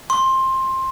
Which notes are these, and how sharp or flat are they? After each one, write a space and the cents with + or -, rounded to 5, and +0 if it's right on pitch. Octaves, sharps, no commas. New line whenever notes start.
C6 +15